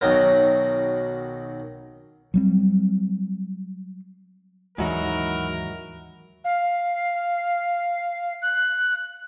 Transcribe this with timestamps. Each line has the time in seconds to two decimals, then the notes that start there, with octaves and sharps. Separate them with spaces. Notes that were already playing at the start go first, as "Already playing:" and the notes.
0.01 B1 D#3 F#3 A#4
2.34 F#3 G3 C4
4.78 D#2 G#2 E3 F#3 D#4 E4 F#4 A#4
6.45 F5
8.42 F#6